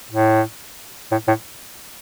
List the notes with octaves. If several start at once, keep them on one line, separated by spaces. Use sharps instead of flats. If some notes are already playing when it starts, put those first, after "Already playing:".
A2
A2
A2